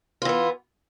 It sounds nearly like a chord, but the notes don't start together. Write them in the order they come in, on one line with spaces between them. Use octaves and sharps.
F4 E3 B3